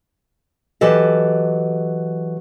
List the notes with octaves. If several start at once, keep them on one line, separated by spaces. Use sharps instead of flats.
E3 F#3 G4 A4 D#5